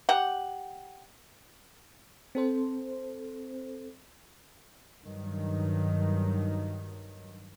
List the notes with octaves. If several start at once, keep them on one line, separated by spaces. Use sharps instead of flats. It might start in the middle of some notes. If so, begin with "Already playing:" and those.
G4 F#5
C4 A4 C5
G2 D#3 F#3